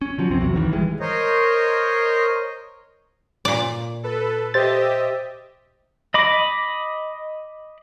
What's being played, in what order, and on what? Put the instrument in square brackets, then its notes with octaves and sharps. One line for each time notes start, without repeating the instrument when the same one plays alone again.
[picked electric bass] C#4
D3 F3 F#3
B1 F#2 C3 C4
B1 E2 F#3
G#1 D#3 E3
E3 G3 G#3
[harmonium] A#4 C5 C#5 D#5
[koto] A#2 D5
[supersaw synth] A4 B4
[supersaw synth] G4 D#5 E5 [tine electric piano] C5 A6
[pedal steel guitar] D#5 B5 D6